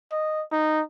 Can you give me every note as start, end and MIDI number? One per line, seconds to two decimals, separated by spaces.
0.12 0.43 75
0.52 0.81 63